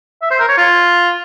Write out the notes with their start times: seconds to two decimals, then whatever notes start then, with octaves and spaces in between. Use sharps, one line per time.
0.22 E5
0.31 C5
0.40 A#4
0.49 C#5
0.57 F4